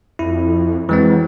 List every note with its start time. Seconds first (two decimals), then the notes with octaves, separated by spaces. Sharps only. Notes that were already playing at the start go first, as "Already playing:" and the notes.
0.19 F2 E4
0.89 E3 F#3 G#3 C4